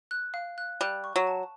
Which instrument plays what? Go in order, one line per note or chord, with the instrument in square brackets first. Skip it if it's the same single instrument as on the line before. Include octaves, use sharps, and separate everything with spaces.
[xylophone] F#6
F5
F#6
[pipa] G3 [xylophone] F#6
[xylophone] C#6
[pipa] F#3
[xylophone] A5